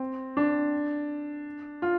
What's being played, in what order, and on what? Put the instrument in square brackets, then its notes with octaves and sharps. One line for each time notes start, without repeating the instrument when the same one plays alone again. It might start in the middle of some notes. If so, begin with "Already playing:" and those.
Already playing: [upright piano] C4
D4
F4